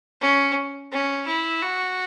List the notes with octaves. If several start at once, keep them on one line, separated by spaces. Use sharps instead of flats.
C#4
C#4
E4
F#4